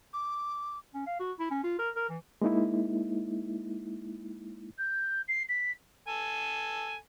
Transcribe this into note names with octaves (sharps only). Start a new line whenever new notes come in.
D6
C#4
F5
F#4
E4
C#4
F4
A#4
A#4
E3
G#3 A#3 D#4 E4
G6
C7
B6
A4 G#5